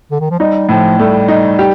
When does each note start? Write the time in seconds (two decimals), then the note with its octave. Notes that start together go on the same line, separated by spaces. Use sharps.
0.11 D3
0.20 D#3
0.30 F3
0.39 G3 D#4
0.69 A2 F3
0.98 G3 A3
1.28 D#4
1.59 G4